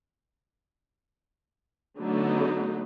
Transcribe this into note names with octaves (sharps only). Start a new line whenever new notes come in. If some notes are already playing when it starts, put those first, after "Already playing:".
D3 F#3 A3 B3 D#4